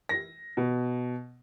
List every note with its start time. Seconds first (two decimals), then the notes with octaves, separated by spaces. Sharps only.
0.09 A#6
0.57 B2